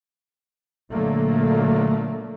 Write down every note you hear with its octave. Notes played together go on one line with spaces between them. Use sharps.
A#2 D3 F#3 A3 A#3